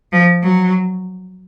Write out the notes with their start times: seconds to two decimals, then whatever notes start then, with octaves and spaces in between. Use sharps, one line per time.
0.12 F3
0.43 F#3